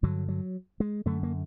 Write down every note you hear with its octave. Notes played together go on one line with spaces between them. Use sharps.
G2 D3 F#3
F#3
G#3
F#2 D3 A3
A#3